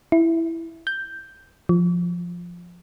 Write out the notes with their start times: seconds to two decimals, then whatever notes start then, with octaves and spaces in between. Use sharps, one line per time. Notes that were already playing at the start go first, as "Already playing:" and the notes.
0.12 E4
0.87 G6
1.69 F3